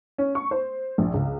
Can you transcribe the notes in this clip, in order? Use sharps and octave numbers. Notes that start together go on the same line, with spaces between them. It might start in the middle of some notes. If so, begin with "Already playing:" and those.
C#4
C#6
C5
A#1
C#2